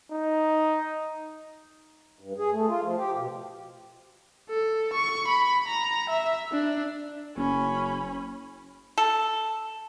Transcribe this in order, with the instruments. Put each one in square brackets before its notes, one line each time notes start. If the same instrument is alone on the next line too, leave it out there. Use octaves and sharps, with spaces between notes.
[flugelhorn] D#4
[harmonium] G2
G#4
A3
F4
F3
G4
B2
[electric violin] A4
C#6
B5
A#5
E5
D4
[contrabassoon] F#1 [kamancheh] C#4 B5
[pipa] A4